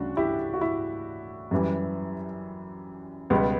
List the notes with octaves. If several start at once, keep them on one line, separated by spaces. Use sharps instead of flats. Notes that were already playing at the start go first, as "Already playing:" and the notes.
Already playing: D2 C#3 G3 C#4 D4 F#4
E4 G4
F#4
E4
F#2 E3 G3
C#2 B2 G3 B3